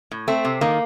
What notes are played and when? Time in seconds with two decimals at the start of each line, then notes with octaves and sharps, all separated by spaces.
0.11 A2
0.28 A3 C4
0.45 C3
0.61 D#3 A#3